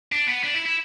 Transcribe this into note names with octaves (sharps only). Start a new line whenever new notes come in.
D4
B3
D4
E4
E4